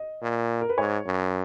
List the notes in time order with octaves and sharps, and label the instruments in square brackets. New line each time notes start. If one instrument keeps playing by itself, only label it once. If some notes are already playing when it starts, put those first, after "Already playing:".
Already playing: [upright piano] D#5
[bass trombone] A#2
[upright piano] A#4
B4
[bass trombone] G#2 [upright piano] C#5
[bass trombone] F#2